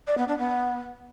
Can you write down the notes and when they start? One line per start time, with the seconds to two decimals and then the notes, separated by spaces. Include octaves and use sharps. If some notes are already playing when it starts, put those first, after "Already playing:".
0.07 D5
0.18 B3
0.28 D4
0.38 B3